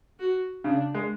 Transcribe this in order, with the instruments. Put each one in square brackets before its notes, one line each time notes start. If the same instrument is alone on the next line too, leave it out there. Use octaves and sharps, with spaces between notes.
[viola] F#4
[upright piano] C#3 [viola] D4
[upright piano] G#3